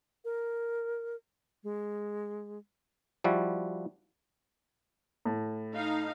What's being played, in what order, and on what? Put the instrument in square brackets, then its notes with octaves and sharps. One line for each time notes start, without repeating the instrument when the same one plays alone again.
[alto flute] A#4
G#3
[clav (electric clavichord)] F3 G3 E4 F#4
[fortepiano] A2
[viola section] D#4 F5